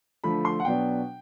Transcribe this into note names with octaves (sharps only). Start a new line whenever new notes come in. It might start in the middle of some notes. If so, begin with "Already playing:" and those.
D3 F3 A3 B5
C6
F#5
B2 F#3 B3 D4 G5